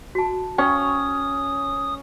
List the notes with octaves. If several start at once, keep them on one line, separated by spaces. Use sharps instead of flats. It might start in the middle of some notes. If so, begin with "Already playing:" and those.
F#4 A5
C#4 G5 C#6 D#6